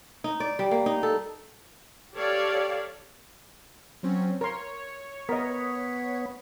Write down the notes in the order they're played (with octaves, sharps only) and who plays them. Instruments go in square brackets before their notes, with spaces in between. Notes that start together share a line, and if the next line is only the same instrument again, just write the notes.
[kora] D#4
D5
G3
A#3
D#4
A4
[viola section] G4 A4 C#5 D5 F5
[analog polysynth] F#3 C4 C#4
[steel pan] A#4 C6 [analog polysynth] C#5
[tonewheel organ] B3 [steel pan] A#4 D#5